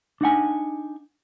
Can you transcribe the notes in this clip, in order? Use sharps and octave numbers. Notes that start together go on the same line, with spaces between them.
D4 D#4 F#5 G#5